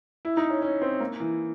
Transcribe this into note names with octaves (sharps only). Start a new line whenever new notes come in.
E4
D#4
C#4
C#4
C4
A#3
E3